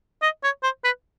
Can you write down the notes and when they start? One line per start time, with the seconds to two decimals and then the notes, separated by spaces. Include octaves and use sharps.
0.23 D#5
0.44 C#5
0.63 C5
0.84 B4